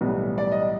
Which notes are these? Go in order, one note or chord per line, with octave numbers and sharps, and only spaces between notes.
B1 A2 E3 G3 B3
D5
D#5